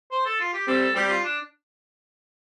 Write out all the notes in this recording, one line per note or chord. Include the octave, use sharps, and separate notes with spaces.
C5
A4
F4
G4
G3 C4 A4
A4
G3 C4 G4
F4
D4